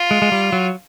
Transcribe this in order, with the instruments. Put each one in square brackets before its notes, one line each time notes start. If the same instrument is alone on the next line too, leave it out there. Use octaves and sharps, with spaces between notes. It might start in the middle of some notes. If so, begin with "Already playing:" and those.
Already playing: [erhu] F4
[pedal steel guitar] G#3
G#3
G3
F#3